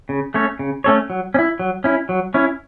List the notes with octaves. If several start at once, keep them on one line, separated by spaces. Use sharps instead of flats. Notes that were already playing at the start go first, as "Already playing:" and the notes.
C#3
A3 C#4 A4 C#5
C#3
A3 C#4 A4 C#5
F#3
C#4
E4
F#3
C#4 E4
F#3
C#4 E4 C#5